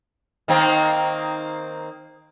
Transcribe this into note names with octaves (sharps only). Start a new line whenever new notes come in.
D#3 A#3 C4